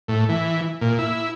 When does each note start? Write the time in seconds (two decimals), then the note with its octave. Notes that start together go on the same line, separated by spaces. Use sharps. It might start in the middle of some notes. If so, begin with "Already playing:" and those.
0.08 A2
0.29 E3
0.81 A#2
0.99 E4